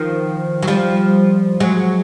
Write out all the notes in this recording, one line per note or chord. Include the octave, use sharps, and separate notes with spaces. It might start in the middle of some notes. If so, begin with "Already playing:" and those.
Already playing: D#3 F3
F#3
F3 G3
F#3 G#3